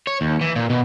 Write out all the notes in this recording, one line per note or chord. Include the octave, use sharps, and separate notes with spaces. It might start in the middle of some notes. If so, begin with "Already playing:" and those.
C#5
D#2
E3
A#2
B2